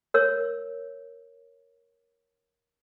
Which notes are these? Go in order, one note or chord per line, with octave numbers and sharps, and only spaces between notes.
A#4 C#5 E6